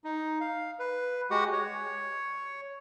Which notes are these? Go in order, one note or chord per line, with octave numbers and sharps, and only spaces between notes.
D#4
F5
B4
G#3 F#4 G4 F#5
C#5